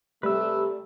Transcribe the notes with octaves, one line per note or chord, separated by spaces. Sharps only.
C3 G3 A3 B4 E6